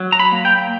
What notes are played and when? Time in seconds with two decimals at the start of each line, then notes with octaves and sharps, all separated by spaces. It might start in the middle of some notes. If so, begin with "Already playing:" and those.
Already playing: F#3
0.12 A#5
0.20 B5
0.32 A#3
0.45 G5